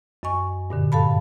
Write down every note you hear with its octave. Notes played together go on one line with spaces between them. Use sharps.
F#2 D#5 G#5 C#6
G2 A#2 D3
A4 F5 A5 B5